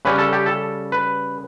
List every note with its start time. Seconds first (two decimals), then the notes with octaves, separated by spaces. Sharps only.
0.05 C#3 G3 C#4 B4
0.18 A4
0.33 G4
0.46 A4
0.92 B4